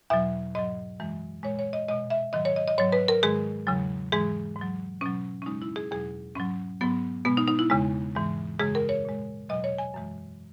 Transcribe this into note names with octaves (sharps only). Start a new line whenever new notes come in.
E2 B2 F#3 E5
G#2 F#3 D#5
F#2 E3 G#3
A#2 G#3 C#5
C#5
D#5
B2 G#3 D#5
E5
G#2 D#3 F#3 D#5
C#5
D#5
D#5
G#2 F#3 C#5
B4
A#4
G#2 D#3 G#3 G#4
E2 C#3 F#3
G#2 E3 G#3 G#4
G#2 F#3
B2 F#3 C#4
C#4
F#2 C#3 G#3 D#4
E4
G#4
E2 B2 F#3 G#4
G#2 F#3 C#4
G#2 F#3 B3
B2 G#3 B3
D#4
D#4
E4
E2 C#3 G#3
G#2 E3 G#3
F#2 C#3 G#3 G#4
A#4
C#5
A#2 G#3
E2 B2 F#3 D#5
C#5
G#5
F#2 E3 G#3